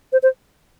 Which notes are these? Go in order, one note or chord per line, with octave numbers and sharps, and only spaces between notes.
C5
C5